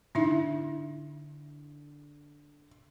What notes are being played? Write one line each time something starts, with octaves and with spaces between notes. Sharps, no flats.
D3 D#4 E4 E5